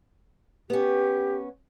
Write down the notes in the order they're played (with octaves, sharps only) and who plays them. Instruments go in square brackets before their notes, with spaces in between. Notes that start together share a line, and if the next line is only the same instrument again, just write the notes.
[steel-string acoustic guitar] B3 C#4 [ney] G4